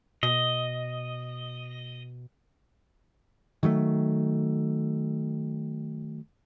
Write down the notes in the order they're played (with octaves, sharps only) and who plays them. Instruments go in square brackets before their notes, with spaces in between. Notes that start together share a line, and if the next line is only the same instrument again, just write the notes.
[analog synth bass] B2 [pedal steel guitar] D#5
[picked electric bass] D#3 F#3 G3 A3